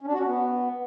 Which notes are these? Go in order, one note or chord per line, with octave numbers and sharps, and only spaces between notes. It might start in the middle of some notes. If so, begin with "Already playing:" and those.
C#4
D4
F#4
C#4
B3